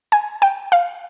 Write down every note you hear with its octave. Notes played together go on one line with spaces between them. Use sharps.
G#5
G5
F5